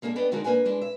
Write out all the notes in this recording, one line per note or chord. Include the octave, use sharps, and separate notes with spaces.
G#3 A#3 D4 G4 A4
B3 D4 B4 D5 D#5 G5
D3 G#3 D#4 F#4 A#4
A#3 D4 B4 G#5
G#3 D4 E4
E5